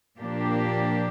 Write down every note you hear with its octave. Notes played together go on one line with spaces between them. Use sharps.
A#2 F3 A#3 D4 G4